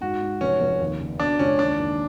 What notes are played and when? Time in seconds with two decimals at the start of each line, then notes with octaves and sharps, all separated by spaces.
0.01 G#2 F#4
0.21 G#2
0.41 F1 C#4
0.60 F1
0.80 D#2
0.99 C#3
1.20 B2 D4
1.39 C#2 C#4
1.59 D#2 D4
1.79 D#2